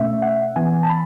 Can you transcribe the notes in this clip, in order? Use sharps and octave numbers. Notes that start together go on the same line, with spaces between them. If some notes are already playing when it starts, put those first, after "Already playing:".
Already playing: B2 A3 C#4 E5
F#5
E3 B3 G#5
A5
B5